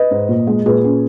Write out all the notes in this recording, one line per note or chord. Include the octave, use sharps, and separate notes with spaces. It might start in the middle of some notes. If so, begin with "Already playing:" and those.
Already playing: B4 D#5
G#2
A#2
G#3
A#2 G#4 B4
C#4